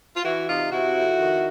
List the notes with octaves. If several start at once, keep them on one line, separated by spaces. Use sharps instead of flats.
F4
E3 E4 F#4
C3 D#4 F4
C3 E4 F#4
F2
D#3